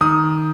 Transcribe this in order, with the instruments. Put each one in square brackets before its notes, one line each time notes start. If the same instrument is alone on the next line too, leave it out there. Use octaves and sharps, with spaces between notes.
[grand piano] D#3 D#6